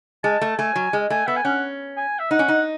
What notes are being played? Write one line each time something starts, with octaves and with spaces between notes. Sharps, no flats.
G#3 A5
A3
A3 G#5
F#3
G#3
A3 G#5
B3 E5
G#5
C#4 F#5
G#5
E5
D#4 F#5
C#4
D#4